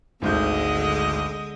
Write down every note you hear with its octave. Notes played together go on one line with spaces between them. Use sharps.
G#1 D2 D3 G#3 D#5 G6